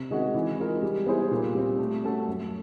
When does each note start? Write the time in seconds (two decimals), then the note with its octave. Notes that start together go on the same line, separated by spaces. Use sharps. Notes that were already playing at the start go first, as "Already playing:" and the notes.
Already playing: C3
0.10 D#3 G#3 C#4 F#4
0.35 E3
0.58 G#3 C4 F4 A#4
0.82 G3
1.06 B3 E4 G#4 C5
1.31 A#2
1.55 G3 C4
1.79 A3
2.03 C#4 F#4 A4
2.27 F#2